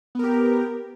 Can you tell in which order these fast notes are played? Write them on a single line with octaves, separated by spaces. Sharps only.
B3 A#4 G4